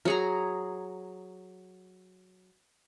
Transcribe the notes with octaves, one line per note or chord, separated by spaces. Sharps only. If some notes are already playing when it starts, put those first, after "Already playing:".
F#3 G#4 A#5